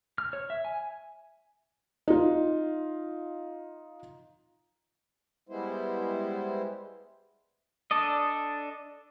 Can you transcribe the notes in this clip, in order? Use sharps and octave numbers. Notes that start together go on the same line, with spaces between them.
F6
C#5
E5
G#5
D#4 F4
G3 G#3 B3 E4 C5
D4 A4 D5 D#5